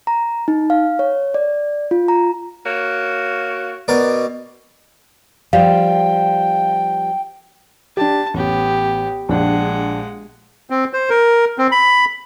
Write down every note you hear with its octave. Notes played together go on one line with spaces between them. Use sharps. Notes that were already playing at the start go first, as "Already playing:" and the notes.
A#5
D#4
F5
C#5
D5
F4
A#5
A#3 F#4 C#5
B2 A#4 D5
F3 G3 F5 G5
D4 G4 A5
A1 B3 G4
A#1 G#3 D4 F#5 G5
C4
C5
A#4
C4
B5